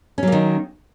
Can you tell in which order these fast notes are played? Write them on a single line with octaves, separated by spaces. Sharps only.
C#4 F#3 A#3 D#3